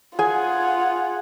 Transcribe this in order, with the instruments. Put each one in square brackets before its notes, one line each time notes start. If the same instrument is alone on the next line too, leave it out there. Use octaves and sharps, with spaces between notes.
[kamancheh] F4 F#5 [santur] G#4 G#5